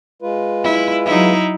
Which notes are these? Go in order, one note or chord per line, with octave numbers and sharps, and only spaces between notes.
G#3 F4 B4
E4
F#3 D#4 E4